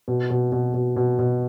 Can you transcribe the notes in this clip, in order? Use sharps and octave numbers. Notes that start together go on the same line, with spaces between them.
B2
B2
B2
B2
B2
B2